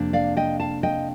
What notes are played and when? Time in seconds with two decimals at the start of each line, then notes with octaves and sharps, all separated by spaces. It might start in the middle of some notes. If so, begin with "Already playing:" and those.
Already playing: F2 C3 A#3 D4
0.13 D5 F5
0.37 D#5 G5
0.60 F5 A5
0.83 D#5 G5